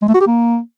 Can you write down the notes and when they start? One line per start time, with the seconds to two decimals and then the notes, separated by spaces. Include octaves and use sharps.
0.02 G#3
0.08 A3
0.14 F#4
0.20 G4
0.27 A#3